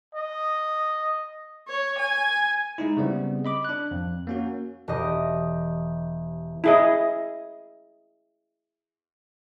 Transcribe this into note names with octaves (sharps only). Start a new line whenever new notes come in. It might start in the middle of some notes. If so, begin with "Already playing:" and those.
D#5
C#5
G#5
G#3 D#4 E4
C#3 G3 B3 C4
D#5 B5 D6
D4 F#6
F2
A#3 C#4 F#4
E1 G4 D#5
E4 G#4 D#5